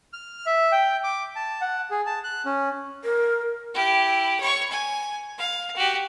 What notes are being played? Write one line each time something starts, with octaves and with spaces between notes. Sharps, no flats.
F6
E5
G5
D6
A5
F#5
G#4
A5
F#6
C#4
A#4
E4 G4
C#5 C#6
G#5
F5
F#4 G4